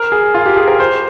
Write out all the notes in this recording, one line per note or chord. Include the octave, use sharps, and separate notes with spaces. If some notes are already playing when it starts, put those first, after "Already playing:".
Already playing: A#4
G#4
F4
G4
G#4
A#4
C5